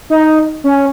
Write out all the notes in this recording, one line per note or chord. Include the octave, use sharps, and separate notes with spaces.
D#4
C#4